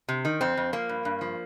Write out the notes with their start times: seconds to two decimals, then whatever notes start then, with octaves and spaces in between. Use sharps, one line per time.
0.09 C3
0.25 D#3
0.41 F2 C4
0.57 F2
0.73 F3 A#3
0.89 G2
1.05 G2
1.21 F3